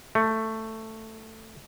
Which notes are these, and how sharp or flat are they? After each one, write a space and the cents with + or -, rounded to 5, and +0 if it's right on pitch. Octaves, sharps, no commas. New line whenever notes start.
A3 +10